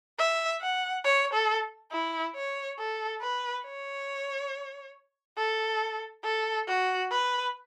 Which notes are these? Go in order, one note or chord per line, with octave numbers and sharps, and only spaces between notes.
E5
F#5
C#5
A4
E4
C#5
A4
B4
C#5
A4
A4
F#4
B4